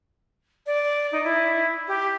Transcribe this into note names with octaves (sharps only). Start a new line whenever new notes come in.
D5
D#4
E4
G4